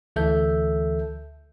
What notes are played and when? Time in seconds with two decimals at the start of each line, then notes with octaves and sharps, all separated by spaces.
0.16 D2 E3 A4 E5 G6